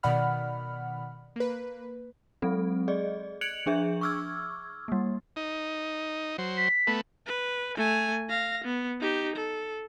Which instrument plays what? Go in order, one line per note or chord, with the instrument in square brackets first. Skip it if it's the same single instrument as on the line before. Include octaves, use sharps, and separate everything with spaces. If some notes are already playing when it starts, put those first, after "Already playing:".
[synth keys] B2 D#3 D5 F#5 B5 F6
A#3 B4
[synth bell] F#3 G#3 C4 A4
G#4 D5 D#5
F#6 G#6 C#7 D7 F7 F#7
F3 D4 G#4 E5
C#6 D6 E6 F6 G#6
G3 A#3
[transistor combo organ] D#4
F#3 C5
[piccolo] B6
[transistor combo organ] A3 B3
[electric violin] B4
A3 G#5
F5 A#6
B3
D#4 G4
A4